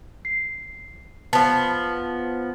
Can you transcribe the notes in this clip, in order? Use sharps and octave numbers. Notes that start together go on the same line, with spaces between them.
C7
F3 B3 A5